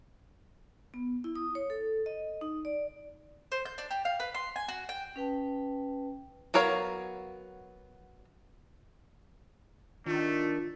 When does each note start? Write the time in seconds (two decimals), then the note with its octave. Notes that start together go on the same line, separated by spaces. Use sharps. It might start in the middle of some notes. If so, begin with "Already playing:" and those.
0.94 B3
1.24 E4
1.35 D#6
1.55 C#5
1.70 A4
2.06 D#5
2.41 D#4
2.65 D5
3.52 C5
3.66 G6
3.78 D4
3.91 G4
4.05 F5
4.20 B4
4.34 C6
4.56 G#5
4.68 F#4
4.89 G5
5.16 C#4 B4 G5 A5
6.54 F#3 B3 A#4 C#5 F5
10.06 D#3 A3 D4 F4